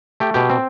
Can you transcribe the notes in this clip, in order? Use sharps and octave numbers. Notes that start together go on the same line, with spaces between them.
A3 G4
B2 G4
C4